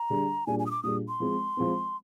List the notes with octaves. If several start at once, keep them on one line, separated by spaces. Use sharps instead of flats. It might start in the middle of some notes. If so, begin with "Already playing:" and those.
Already playing: A#5
D3 G3 D4 G#4
A#2 G3 D4 G#4 G#5
G#5
D#6
D6
A#2 G3 D4 G#4 D#6
C6
F3 G#3 C4
F3 G#3 C4